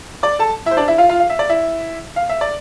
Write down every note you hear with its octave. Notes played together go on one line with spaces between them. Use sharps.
D5 D6
A4 A5
E4 E5
C5
D4 D5
E4 E5
F4 F5
F4 F5
F5
E5
D5
E4 E5
F5
E5
D5